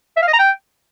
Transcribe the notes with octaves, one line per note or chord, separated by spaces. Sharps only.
E5
F5
D#5
A#5
G5